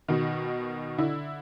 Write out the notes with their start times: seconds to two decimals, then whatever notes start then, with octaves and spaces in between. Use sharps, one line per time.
0.08 B2 D#3
0.98 D3 E4